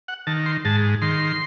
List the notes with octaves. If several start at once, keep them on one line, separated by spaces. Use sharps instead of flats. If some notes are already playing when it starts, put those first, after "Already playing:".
F#5
D#3 A5
C6
G#2 A5
D#3 C6